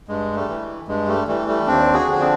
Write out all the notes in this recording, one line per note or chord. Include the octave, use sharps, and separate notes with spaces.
G2 G#3
G3 A3
E3
G2 G#3
G3 A3
E3 G3 A3
G3 A3
D#2 C4 D4
F#4 G#4
D3 F3
C4 D4